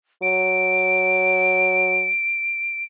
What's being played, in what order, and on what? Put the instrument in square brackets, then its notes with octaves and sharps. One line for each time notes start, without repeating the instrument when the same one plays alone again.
[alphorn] F#3 [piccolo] D7